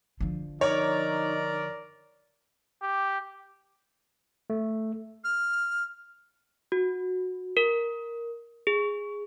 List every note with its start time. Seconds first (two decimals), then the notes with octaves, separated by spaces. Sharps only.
0.20 D3 F3
0.61 D#4 A#4 C#5 D5
2.82 G4
4.50 A3
5.24 F6
6.72 F#4
7.57 A#4
8.67 G#4